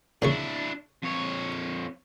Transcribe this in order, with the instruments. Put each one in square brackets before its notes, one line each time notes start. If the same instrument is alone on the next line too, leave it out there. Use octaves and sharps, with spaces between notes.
[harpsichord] A#2 C#3 C#6 [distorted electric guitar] D4 E4
[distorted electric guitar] F2 C#5